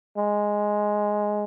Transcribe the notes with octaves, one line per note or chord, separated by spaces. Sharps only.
G#3